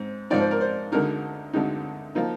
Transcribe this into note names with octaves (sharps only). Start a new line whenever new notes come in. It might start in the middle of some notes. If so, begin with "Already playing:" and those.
Already playing: G#2 C4
G#2 F3 C4 D#4 D5
C5
A#4
C5
D2 D3 G#3 D#4 A#4
D2 D3 G#3 D#4
F3 A#3 D#4